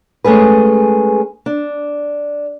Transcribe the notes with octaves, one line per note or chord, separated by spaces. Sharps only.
G#3 A3 C#4 G#4 B4
D4